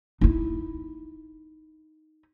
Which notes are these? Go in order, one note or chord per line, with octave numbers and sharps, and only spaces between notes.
D#4 E4